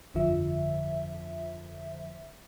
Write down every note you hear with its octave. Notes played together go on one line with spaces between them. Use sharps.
G1 F2 D3 F3 E5